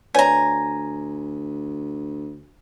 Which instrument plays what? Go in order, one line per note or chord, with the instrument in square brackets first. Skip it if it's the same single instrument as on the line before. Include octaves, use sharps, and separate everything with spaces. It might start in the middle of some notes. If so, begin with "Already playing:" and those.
[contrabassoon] D2 [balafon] B4 C#5 D5 [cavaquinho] G#5 A#5